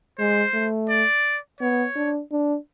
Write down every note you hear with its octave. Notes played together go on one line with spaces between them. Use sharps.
G#3 C5
A3
D5
B3 C#5
D4
D4